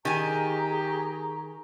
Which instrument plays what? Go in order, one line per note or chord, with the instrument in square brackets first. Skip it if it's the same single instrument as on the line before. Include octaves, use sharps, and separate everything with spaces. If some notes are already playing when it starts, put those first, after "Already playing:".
[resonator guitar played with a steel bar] D#3 G#5 [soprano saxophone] G4 [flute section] G#4 A#5 C#6